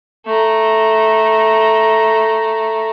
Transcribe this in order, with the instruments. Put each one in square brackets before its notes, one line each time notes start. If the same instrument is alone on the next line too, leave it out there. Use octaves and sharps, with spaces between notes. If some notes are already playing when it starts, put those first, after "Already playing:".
[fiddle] A3 A#5